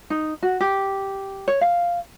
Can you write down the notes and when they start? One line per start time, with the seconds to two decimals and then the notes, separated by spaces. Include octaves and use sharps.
0.10 D#4
0.43 F#4
0.61 G4
1.48 C#5
1.61 F5